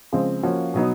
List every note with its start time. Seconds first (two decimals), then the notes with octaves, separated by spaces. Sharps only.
0.13 C#3 F3 G#3 C4
0.43 F3 A#3 C#4 F#4
0.74 B2 F#3 B3 D#4